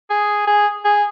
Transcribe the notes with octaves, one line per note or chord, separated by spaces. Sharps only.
G#4
G#4
G#4